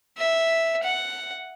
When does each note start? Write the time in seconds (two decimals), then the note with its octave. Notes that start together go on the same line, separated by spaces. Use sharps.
0.18 E5
0.83 F#5